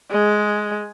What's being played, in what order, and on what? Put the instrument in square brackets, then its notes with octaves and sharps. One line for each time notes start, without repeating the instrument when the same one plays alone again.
[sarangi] G#3